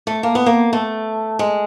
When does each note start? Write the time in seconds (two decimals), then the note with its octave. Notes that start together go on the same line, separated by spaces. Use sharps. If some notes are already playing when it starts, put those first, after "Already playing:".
0.07 A3
0.23 A#3
0.35 B3
0.46 A#3
0.73 A3
1.39 G#3